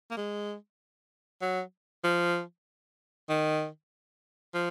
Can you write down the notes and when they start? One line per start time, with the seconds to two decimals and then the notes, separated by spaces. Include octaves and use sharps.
0.11 A#3
0.17 G#3
1.42 F#3
2.04 F3
3.29 D#3
4.54 F3